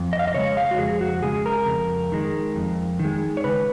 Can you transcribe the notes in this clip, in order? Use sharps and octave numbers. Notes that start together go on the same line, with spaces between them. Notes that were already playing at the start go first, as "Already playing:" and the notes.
Already playing: F2
D#5
F5
D#5
C#3 G#3 C#5
F5
F#4
F2 G#4
F#4
C#3 G#3 G#4
A#4
F2
D#3 G#3
F2
D#3
G#3
C#5
C#3 B4